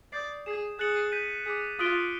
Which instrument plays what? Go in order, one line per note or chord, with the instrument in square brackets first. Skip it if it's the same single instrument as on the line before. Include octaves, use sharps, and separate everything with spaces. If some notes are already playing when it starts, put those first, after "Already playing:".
[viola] D5 [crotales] D#6 G6 C7
[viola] G#4 [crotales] G#6 C7 E7
[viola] G#4 [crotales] F#6 A6 C#7 F#7
[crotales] G6 B6 D#7 F#7
[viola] G#4 [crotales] D6 F#6 B6
[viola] F4 [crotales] D#6 F#6 B6 D7 G7